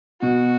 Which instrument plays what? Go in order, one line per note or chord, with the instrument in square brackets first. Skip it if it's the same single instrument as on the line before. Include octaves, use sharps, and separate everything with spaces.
[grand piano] B2 [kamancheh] F#4